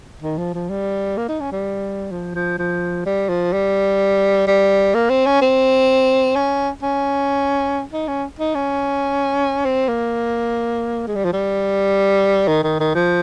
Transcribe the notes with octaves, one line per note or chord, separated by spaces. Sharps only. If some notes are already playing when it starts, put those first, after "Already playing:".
D#3
F3
F3
G3
A#3
D#4
C#4
G3
F3
F3
F3
G3
F3
G3
G3
A#3
C4
C#4
C4
C#4
C#4
D#4
C#4
D#4
C#4
C4
A#3
G#3
G3
F3
G3
D#3
D#3
D#3
F3